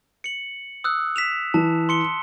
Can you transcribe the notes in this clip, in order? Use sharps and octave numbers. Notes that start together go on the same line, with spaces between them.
C#7 F#7
D#6 E6 F#6
B6 E7 F7
E3 A5
C6 C#7 G7